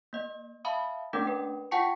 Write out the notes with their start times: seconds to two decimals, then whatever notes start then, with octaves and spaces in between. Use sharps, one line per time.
0.13 A#3 D#5
0.65 E5 F5 A5 B5 D#6
1.13 A3 A#3 C#4 D4 A#4 G5
1.27 B4
1.71 F4 F#5 G5 A5 C#6 C#7